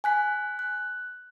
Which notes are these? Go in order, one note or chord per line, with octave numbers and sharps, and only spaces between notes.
G#5 F#6 B6
F#6